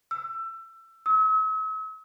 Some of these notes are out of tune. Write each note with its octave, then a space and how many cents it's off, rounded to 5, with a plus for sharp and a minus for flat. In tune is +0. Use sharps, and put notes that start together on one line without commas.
E6 +25
E6 -45